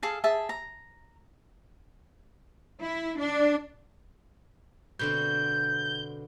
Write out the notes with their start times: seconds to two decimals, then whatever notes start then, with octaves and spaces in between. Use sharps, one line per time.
0.03 G#4 A4 F5
0.24 G#4 E5 A5
0.49 A#5
2.80 E4
3.19 D4
4.99 B2 D3 C4 G6